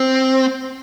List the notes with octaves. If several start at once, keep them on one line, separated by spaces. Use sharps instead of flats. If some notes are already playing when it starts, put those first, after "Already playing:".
Already playing: C4